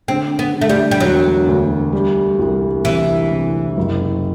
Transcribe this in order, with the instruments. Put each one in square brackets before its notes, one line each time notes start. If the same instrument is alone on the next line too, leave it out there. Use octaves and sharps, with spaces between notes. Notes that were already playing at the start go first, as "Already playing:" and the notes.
[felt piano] D3 [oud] C4
[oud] B3
[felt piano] D3
[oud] A3
G3
G3
[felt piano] E1 [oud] F#3
[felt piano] D2
G3
C2
[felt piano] C3 [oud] E3
[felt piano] C3
F#1